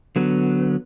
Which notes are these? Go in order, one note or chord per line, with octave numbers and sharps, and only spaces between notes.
D3 F#3 B3